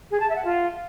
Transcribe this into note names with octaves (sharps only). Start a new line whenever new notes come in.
G#4
A5
E5
F#5
F4